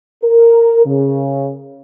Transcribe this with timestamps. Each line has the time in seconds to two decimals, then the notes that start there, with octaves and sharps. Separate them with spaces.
0.23 A#4
0.85 C#3